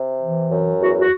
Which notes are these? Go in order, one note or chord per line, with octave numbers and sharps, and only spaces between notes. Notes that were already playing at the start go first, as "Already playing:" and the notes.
Already playing: C3
E3
F#2
E2 F#4
F#4